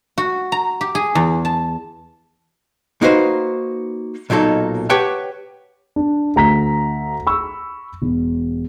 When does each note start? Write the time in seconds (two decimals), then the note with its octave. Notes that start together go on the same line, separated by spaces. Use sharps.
0.18 F#4
0.52 A#5
0.81 G4
0.95 G#4
1.15 E2
1.45 A5
3.02 A#3 D#4 F#4 B4 C5
4.30 B1 A#2 F#3 D#4 A4
4.90 G4 B4 C#5 F#5 G5 A5
5.96 D4
6.36 D2 A#5 B6
7.27 B5 C#6 E6
8.02 E1